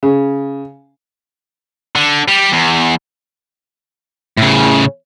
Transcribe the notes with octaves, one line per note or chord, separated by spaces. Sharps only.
C#3
D3
G3
E2
A2 C#3